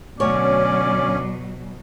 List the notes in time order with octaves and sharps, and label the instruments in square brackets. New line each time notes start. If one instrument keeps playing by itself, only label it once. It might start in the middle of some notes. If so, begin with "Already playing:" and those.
[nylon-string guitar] D2 C#5 [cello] B2 F#3 [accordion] C#4 [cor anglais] D5